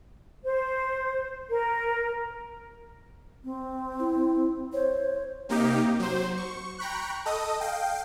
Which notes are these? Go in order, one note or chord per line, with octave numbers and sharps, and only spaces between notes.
C5
A#4
C4
E4
C5 C#5
C3 A#3 D#4 G4
F#3 C5
C#6
G5 A#5 B5 C#6 F#6
A4 D#5 D#6
F5 G5